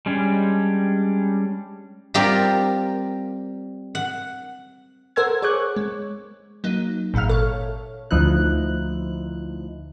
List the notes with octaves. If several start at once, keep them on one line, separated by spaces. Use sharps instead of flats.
G3 G#3 C#4 D4
G3 C4 F4 G4 A#4
F#5
A4 A#4 C5 F#5 E6 G#6
G#4 C#5 C#6 D6 F#6
G#3
F#3 A#3 D#4
G#1 A#2 E5 F5 F6
A4 C#5
D2 F3 D#4 E4 F#6